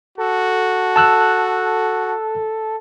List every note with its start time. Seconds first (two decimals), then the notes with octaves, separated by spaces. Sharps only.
0.18 F#4 A4
0.96 A5 E6 F#6